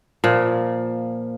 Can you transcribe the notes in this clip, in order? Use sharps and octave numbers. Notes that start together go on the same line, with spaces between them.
A#2 F3